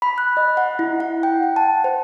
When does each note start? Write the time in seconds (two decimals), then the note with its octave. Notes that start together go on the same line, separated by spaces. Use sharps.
0.02 B5
0.18 F#6
0.37 D#5
0.57 F#5
0.79 E4
1.00 F#5
1.23 G5
1.43 F#5
1.56 A5
1.84 C5